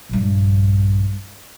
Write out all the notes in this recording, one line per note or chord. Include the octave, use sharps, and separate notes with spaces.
A#1 G2